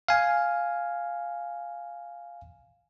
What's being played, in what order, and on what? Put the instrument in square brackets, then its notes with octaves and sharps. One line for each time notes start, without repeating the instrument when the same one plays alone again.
[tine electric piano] F5 G#5